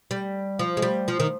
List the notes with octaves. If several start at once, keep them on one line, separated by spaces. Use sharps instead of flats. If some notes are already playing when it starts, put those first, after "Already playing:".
G3
F3
G#3
G3
F3
D#3